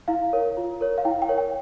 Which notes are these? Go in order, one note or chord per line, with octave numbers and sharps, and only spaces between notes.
E4 F5
A#4 C#5
F4
A#4 C#5
F5
E4 G5
G5
A#4 C#5
G5